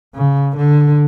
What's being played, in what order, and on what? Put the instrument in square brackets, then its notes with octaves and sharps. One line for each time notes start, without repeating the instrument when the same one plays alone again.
[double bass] C#3
D3